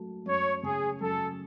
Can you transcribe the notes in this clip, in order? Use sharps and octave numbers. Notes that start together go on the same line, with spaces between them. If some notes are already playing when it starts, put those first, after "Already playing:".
Already playing: F#2 F#3 A3
F#2 C#5
C#3 G#4
F#2 A4